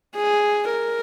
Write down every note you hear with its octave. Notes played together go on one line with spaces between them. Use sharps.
G#4
A#4